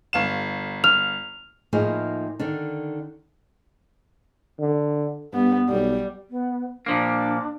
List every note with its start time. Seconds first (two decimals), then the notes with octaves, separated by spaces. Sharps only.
0.13 G1 F5 E7
0.84 F6 F7
1.73 A2 F3 A#3 D#4 E4 G#4
2.39 D3 D#3 D4
4.60 D3
5.34 G2 B3
5.69 B1 G3
6.30 B3
6.86 A#2 F3 A#3 D4